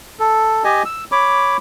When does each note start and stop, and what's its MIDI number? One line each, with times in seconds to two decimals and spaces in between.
0.19 0.64 69
0.64 0.83 67
0.64 0.83 75
0.64 0.83 80
0.85 1.04 88
1.12 1.57 73
1.12 1.57 83
1.12 1.57 86